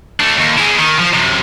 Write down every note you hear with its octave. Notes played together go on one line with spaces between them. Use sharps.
A3 D4
D#2
E4 G#4
D#3
F3
F#2 C3